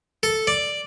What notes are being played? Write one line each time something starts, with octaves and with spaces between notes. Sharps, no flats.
A4
D5